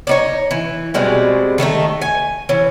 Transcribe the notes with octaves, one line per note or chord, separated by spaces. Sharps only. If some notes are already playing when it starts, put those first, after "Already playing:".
D4 D#4 C#5
E3
B2 G3 G#3 C4
D#3 A3 D4 D#4
G#5
E3 C#4